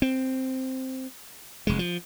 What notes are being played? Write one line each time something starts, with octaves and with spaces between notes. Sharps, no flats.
C4
F1 G#3
F3